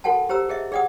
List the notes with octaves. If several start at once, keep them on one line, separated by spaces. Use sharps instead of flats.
F#4 A4 A#4 F#5 G5 A5
G4 C5 A#5 E6
G#4 D#5 E5
G#4 D5 F#5 G5 D#6